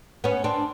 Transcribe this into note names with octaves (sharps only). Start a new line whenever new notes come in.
B3 C#4
C4 D4